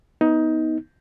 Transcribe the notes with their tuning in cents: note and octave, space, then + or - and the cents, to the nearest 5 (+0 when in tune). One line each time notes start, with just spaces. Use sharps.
B3 +0 D#4 +20